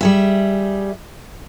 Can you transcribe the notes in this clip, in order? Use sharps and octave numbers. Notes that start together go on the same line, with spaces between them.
G3 G#4 E5